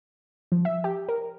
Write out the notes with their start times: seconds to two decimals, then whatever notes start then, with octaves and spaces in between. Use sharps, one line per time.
0.52 F3
0.65 E5
0.84 G4
1.09 A#4